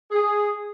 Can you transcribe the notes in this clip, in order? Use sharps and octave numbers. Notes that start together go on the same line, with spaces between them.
G#4